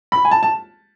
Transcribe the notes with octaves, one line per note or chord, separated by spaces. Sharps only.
B5
G#5
A5
A5